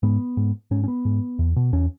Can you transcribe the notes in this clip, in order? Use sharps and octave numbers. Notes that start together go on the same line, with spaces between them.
G#2 B3
G#2
G#2 C#4
C#4
B3
G#2
E2
B2
E2 C#4